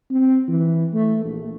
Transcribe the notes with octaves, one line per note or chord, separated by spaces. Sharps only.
C4
E3
A3
A#1